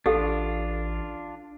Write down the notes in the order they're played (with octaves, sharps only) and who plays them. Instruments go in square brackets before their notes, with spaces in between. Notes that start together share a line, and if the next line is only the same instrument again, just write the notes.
[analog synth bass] A1 [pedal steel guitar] D4 F4 [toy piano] G4 A4 F5